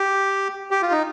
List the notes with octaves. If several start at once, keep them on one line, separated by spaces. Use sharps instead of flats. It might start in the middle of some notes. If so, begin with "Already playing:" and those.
Already playing: G4
G4
F4
D#4